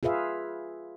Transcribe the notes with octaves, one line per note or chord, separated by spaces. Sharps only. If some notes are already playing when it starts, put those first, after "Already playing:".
F4 G#4 B4 E5 F5